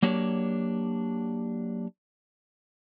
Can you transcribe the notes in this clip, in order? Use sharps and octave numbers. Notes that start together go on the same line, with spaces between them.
F#3 A#3 D4 G4 C#5